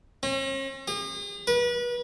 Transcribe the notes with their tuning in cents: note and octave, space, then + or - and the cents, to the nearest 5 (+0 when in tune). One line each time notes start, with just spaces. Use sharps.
C#4 -45
G#4 -45
B4 -35